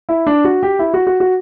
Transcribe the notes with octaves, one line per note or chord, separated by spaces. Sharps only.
E4
D4
F#4
G4
E4
F#4
F#4
F#4